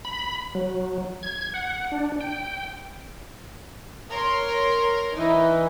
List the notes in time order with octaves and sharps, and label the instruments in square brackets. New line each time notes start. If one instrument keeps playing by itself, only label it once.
[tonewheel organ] B5
F#3
G#6
F#5
D4
G5
[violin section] A#4 C#5 C6
[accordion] E3 [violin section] D#4